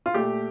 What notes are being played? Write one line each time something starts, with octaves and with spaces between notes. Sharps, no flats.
F4
A#2 A3 G4